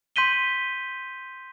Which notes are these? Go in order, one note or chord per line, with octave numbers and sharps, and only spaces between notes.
C6 G6 B6 D#7 G7